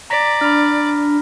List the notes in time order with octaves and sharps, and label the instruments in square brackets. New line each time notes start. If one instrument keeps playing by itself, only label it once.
[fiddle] D5 [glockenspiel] A#5 A#6 B6
[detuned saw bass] D4 [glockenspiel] B5 F6